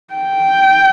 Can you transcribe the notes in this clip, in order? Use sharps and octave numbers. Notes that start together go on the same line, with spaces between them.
G5